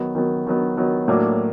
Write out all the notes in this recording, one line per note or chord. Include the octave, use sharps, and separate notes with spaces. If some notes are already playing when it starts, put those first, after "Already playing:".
Already playing: D#3 F#3 B3
D#3 F#3 B3
D#3 F#3 B3
D#3 F#3 B3
A2 F#3 A#3 D4